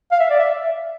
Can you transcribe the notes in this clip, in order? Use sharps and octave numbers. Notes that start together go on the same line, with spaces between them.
F5
E5
D5
E5